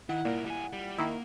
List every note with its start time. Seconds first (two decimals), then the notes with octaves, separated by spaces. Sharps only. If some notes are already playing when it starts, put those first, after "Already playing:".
0.09 D#3 E4 F#5
0.25 C2 A#2 A#4
0.46 G3 G#5
0.73 G3
0.98 D#3 A#3 E4